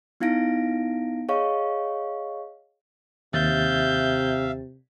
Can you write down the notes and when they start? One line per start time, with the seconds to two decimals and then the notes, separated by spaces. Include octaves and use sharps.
0.20 B3 D#4 E4 F5 A#6 D7
1.29 G#4 C#5 D#5 F5 C#6
3.34 D#2 C3 E5 F5 G6 A6